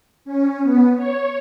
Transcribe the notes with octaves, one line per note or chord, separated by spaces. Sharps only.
C#4
B3
C#5